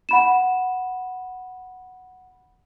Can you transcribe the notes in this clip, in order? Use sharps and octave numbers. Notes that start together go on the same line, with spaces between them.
F#5 B5 E7